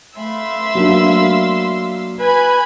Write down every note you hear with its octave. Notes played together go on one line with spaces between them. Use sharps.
A3 E5 F5 B5 C6 E6
F#3 A#3 D4
B4 G#5 B5 G#6